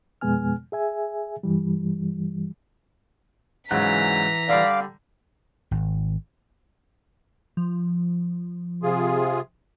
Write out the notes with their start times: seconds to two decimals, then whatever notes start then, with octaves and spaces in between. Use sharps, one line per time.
0.21 F2 B2 G#3 B3 G#5 F6
0.72 G#4 E5 G#5
1.43 G2 E3 G3
3.71 G#2 C#3 E3 F#3 F#5 A#5 F#6 B6
4.49 D3 G3 D5 F5
5.71 G#1
7.57 F3
8.83 C3 F4 G#4